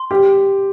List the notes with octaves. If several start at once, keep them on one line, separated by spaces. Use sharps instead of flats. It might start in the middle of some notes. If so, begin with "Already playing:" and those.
Already playing: C6
G4